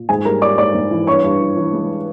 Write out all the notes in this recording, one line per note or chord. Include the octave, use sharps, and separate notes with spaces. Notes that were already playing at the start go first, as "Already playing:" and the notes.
Already playing: A#2
G#2 G#4 G#5
G3 A#4 A#5
G3 D5 D6
G#2 D5 D6
G#2
E3
G2 C#5 C#6
G2
E3
E3
G#3